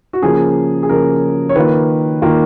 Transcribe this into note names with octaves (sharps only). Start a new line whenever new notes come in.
F#4
C#3 F3 A#3 G#4
G#4
C#3 F3 A#3 A#4
C#5
D#3 A#3 F4 B4
D#3 A#3 F4